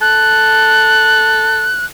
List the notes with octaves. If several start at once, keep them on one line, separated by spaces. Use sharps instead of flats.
A4 F#6